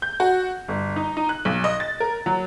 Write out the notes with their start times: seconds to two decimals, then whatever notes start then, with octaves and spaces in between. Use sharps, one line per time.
0.02 G6
0.20 F#4
0.68 G1
0.96 D#4
1.17 D#4
1.29 F#6
1.45 B1
1.64 D#5
1.80 A6
2.00 A#4
2.26 F#3